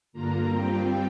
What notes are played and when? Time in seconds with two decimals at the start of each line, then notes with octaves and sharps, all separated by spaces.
0.13 G2 D3 A#3 F4 A#5
0.49 G2 G3 C4 F4 G5